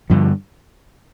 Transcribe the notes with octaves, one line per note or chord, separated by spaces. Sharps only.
G2 D3 F3